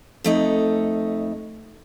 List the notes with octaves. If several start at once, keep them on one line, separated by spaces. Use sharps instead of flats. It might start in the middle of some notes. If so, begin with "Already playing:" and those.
F2 A3 D#4